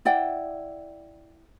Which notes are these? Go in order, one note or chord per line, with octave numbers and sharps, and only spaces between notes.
E4 D5 F#5 G5